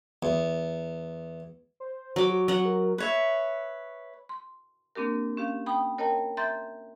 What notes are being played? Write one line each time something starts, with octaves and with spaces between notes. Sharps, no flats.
E2
C5
F#3 D6
F#4
F#3 F#5
A#4
B4 C#5 E5
C6
A#3 C4 D4 G4 A#4
C#4 G4 F5
G5 B5 D#6
A#4 C#5 D#5 G5 A5 A#5
E5 A#5 C6 G6 A6